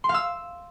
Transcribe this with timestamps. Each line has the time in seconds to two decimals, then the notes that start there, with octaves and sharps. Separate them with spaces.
0.04 C6
0.09 F5
0.14 E6